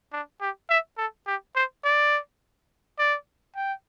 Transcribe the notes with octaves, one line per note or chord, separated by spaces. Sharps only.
D4
G4
E5
A4
G4
C5
D5
D5
G5